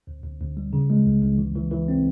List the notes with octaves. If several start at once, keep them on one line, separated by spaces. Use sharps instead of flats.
D2
D2
D2
G3
C#3
G#3
C#2
C#2
E3
E3
E3
C4